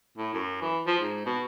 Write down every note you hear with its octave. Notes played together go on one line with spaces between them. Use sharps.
A2
F#2
E3
F3
G#2
B2